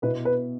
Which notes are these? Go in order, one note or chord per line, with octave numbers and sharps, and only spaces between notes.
B2 B3 E4 B4
B4